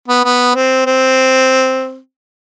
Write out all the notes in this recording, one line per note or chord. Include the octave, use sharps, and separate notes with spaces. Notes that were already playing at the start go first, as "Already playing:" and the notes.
B3
B3
C4
C4